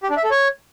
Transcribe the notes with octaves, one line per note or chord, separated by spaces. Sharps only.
G4
D4
E5
A4
C#5